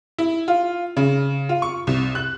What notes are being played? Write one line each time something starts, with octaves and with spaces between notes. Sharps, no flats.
E4
F4
C#3
F4
C#6
C2
F#6